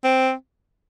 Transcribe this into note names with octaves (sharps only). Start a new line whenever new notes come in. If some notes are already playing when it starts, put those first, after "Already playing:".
C4